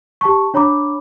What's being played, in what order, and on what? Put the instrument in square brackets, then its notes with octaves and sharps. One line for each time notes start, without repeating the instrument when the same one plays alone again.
[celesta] G4 A5 C#6
D4 C#5 A#5 B5 D6